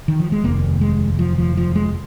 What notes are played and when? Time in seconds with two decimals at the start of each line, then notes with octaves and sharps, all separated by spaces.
0.08 D#3
0.20 F3
0.32 G#3
0.44 F1 D#2 A#3
0.81 G#3
1.19 F3
1.38 F3
1.57 F3
1.75 G#3